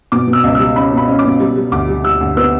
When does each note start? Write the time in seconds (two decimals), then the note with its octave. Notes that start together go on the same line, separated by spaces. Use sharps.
0.12 B2 D6
0.27 B2
0.33 E6
0.43 C#2
0.55 G3 E6
0.76 C#4 B5
0.93 B2 B5
1.08 C#4
1.19 D6
1.24 B2
1.40 G3
1.56 G3
1.72 D2 D6
1.88 G3
2.04 G3 E6
2.21 D2
2.37 B3 E6